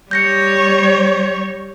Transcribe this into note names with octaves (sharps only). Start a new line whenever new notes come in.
G3 C#5 G6 A#6 C#7